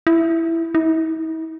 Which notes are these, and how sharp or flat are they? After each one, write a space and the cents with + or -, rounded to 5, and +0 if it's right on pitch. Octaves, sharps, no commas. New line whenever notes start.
E4 +5
E4 -45